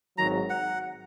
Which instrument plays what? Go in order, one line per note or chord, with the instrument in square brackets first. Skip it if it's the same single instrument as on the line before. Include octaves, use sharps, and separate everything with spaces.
[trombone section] G#1 G#2 D#3 F#3 [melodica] A#5
[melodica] F#5